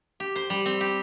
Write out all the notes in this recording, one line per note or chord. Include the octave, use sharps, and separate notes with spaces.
G4
C5
G3
C4
G4